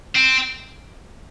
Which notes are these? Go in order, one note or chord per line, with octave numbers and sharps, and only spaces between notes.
C4